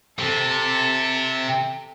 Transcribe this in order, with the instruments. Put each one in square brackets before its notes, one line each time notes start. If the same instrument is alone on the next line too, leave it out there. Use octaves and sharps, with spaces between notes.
[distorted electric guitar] C3 [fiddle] A4